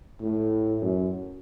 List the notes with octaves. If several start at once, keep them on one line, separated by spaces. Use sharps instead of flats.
A2
F#2